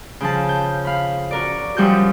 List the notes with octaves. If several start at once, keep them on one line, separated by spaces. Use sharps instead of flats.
C#3 F3 A5
G6
F5 B5
F#4 A#4 D5
F#2 F3 G3 F#4 D#6 G6